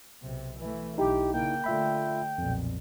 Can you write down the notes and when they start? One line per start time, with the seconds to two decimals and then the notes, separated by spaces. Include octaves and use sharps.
0.22 B1 C3
0.59 E3 A3
0.98 B1 D#4 E4 G4
1.34 C#3 A#3 G5
1.64 D3 A3 F4 E5 B5
2.38 B1 F2 A#2